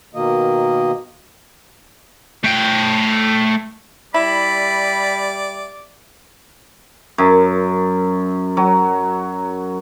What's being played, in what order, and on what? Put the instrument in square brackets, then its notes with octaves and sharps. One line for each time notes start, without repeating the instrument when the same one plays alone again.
[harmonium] B2 D#3 A#3 D#5
[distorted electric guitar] A3 G5
[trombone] G3 [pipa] E4 [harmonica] D5 [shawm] B5
[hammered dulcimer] F#2
F#3